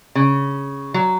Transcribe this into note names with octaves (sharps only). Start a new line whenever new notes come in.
C#3
F#3